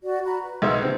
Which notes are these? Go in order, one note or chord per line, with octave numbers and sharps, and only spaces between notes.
F#4 D5
F#4 A#5 B5
B4
B1 G#3 E5
D3 C4